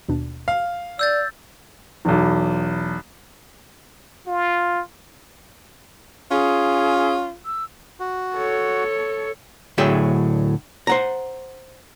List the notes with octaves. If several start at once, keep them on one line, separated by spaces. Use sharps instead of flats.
D#2 B2 D4
F5
D5 E6 G6 A6
B1 E2
F4
C#4 F4 G#4
E6
F#4
A4 C#5
D2 A2 F#3 G#4 E5 G5
C5 F#5 A#5